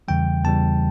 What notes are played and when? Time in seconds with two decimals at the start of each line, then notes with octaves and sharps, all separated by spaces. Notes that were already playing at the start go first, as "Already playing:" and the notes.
0.08 E2 C#3 E3 G3 G5
0.43 E2 C#3 E3 G3 A5